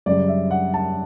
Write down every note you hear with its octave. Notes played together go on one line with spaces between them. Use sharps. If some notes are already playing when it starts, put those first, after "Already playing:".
F#2 C#3 G3 D5
E5
F#5
A5